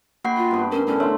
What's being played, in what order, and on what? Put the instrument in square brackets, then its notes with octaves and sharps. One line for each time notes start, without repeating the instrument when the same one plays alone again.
[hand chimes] A#3 F#5 C7 [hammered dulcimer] F#4 G5 B5
[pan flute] F4
[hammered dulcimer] G2 B3
[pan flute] C#4 [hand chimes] A#4
[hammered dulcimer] A2 D3 [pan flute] C#4
[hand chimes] C#5 [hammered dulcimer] E5 A#5 C6